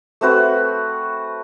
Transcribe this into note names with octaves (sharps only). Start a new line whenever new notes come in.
A3 C4 F#4 B4